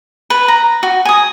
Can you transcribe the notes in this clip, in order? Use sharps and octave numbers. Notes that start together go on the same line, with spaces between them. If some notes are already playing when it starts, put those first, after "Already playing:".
B4
A#5
F#4
G#5 D#6